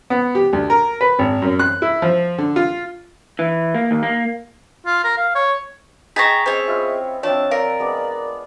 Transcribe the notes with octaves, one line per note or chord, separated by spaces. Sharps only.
B3
G4
D2
A#4
B4
G#1
F#2
F#6
E4
F3
D3
F4
E3
A#3
D#2
A#3
F4
A#4
F5
C#5
G#4 D#5 G5 A5 A#5 C#6 A6 B6
C4 C#4 G#4 C#5 D#5
E4 F4 D#5
F3 C4 D4 C#5 A5
A#4 D5 F5
G#3 B3 D4